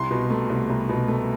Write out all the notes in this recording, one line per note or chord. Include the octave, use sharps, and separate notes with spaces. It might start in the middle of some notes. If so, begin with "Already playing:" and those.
Already playing: C2 C6
B2
A3
C2
C2
B2
A3